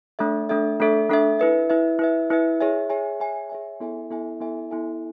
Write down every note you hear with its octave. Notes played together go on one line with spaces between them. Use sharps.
A3 D4 A4 E5
A3 D4 A4 E5
A3 D4 A4 E5
A3 D4 A4 E5
E4 B4 E5
E4 B4 E5
E4 B4 E5
E4 B4 E5
G#4 C#5 E5 G#5
G#4 C#5 E5 G#5
G#4 C#5 E5 G#5
G#4 C#5 E5 G#5
B3 E4 A4 E5 G#5
B3 E4 A4 E5 G#5
B3 E4 A4 E5 G#5
B3 E4 A4 E5 G#5